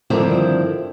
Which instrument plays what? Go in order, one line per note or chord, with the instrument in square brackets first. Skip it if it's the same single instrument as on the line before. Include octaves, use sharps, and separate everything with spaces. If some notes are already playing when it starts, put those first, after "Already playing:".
[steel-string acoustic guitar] G2 D3 D#3 F3 C4 E4